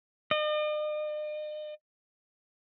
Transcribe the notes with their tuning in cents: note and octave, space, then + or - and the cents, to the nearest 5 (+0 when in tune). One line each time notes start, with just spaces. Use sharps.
D#5 -45